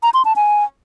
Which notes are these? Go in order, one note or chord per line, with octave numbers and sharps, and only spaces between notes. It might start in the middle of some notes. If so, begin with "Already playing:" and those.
A#5
C6
A5
G#5